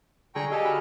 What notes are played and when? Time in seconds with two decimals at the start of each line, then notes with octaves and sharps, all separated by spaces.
0.35 D3 G#4 G5 A#5 C#6
0.51 G4 A4 D#5 F5 G#5 A5
0.63 F#4 B5 F6